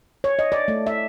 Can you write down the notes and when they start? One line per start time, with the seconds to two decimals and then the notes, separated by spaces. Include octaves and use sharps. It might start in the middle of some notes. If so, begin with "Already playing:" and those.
0.24 C#5
0.39 D#5
0.52 D5
0.68 A3
0.87 E5